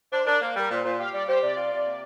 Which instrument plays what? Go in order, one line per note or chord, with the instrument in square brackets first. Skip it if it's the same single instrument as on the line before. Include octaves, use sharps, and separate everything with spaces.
[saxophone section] D4 [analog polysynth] C5
[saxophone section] D4 [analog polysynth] A#4
[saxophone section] A#3 [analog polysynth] C5
[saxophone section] G3 [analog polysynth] A#4
[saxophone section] A#2 [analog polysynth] C5
[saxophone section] A#2 [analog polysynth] C5
[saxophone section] G4 [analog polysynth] F5
[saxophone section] G3 [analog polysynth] D5
[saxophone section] G4 [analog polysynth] C5
[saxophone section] C3 [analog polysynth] D5
[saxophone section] F4
C3
A#3